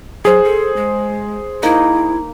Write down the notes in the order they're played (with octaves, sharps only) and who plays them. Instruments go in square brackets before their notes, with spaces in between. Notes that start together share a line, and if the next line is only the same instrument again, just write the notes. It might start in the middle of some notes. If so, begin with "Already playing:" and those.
[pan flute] F#3 [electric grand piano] G#4 C5
[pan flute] A4
G#3
[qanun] A#3 D#4 [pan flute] E4